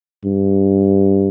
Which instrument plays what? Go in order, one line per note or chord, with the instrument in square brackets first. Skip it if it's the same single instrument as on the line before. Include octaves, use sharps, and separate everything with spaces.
[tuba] G2